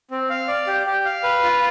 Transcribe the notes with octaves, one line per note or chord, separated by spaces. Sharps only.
C4
F5
D5
G4
G4
F5
B4
F4